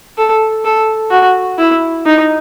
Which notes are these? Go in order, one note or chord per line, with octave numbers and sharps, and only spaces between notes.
A4
A4
F#4
E4
D#4